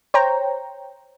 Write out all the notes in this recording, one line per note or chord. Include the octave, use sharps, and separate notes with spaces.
C5 C#5 G5 A#5